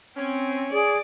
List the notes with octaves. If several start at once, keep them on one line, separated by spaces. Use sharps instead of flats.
C4 C#4
G#4 D5